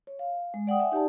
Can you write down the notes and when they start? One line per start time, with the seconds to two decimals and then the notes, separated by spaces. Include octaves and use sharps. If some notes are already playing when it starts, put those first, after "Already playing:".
0.07 C#5
0.19 F5
0.54 G#3
0.67 D5 F#5 G5 D#6
0.79 E5 F#5 G#5
0.92 D#4 G4 D5 A5